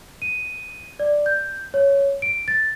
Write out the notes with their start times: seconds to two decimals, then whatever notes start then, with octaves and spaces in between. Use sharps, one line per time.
0.22 D#7
1.00 D5
1.26 G6
1.74 C#5
2.22 D7
2.48 A6